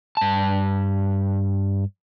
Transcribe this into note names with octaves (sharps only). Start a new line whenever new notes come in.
G2 A5